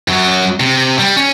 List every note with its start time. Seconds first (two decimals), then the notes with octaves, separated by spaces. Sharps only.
0.08 F#2 F#3
0.60 C3
0.99 G3
1.17 C#4